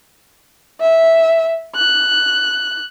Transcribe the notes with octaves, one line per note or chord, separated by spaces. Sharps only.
E5
F#6